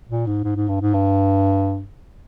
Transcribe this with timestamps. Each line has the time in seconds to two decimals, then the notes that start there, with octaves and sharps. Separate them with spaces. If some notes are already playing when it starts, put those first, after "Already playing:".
0.09 A#2
0.26 G#2
0.44 G#2
0.56 G#2
0.68 G2
0.81 G#2
0.94 G2